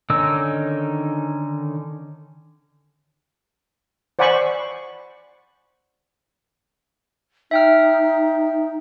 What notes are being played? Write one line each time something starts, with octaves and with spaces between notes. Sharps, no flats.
D3 D#3 C#4 D#4 E6
C5 D5 F#5 G#5 B5 C#6
D#4 E5 G5 F6